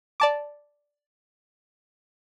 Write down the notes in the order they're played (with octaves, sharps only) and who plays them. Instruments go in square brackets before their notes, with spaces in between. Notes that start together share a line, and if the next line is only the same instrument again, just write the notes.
[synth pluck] D5 A5 D6